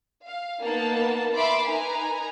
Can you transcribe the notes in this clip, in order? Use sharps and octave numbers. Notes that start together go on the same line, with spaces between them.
F5
A#3 B3 D#4 A5
E5 B5 C6 D6
D#4 A#4 B4 G#5 A#5